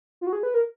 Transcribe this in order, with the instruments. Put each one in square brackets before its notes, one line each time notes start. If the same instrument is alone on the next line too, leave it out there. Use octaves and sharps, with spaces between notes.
[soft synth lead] F4
F#4
G#4
B4
A#4